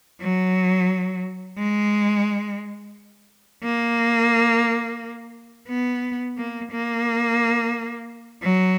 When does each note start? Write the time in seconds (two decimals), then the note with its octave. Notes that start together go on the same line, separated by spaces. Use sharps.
0.22 F#3
1.58 G#3
3.63 A#3
5.68 B3
6.38 A#3
6.72 A#3
8.42 F#3